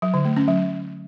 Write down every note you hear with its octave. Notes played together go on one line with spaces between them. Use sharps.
F#3
D3
A3
C#4
F#3